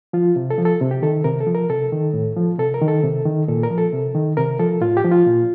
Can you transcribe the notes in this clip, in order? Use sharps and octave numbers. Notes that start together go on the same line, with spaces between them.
F3 F4
C3
A4
F3
A4
C3
G4
D#3 A4
C3 A#4
A4
F3
A#4
C3 A4
D#3
A2
F3
C3 A4
A#4
D#3
A4
C3
D#3
A#2 A4
A#4
F3
A4
C3
D#3
C3 A#4
F3 A4
A2 F4
G4
F3
F4
A#2